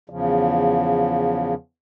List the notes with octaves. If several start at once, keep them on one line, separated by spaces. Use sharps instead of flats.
E2 C#3 F3